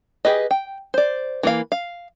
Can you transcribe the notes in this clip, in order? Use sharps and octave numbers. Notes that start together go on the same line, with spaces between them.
G4 G#4 B4 D#5
G5
C5 D5
E3 A#3 F5
F5